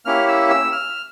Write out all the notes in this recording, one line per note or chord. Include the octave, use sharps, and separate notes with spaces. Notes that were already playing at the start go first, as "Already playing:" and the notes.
A#3 C#4 E4 G4 F6
E6
E6
F6